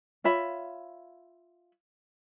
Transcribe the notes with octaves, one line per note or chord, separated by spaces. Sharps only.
F4 C#5 E5 B5